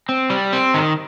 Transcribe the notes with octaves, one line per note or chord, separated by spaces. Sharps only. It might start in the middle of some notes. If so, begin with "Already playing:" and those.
C4
G3
C4
D#3